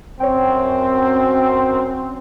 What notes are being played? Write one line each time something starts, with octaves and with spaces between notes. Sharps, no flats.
F#2 C4 C#5 G5